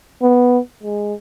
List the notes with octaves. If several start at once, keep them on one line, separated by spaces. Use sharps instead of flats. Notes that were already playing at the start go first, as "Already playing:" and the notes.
B3
G#3